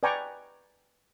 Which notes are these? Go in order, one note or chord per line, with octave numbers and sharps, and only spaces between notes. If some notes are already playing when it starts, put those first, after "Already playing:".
B4 D5 G5 G#5 A#5 C#6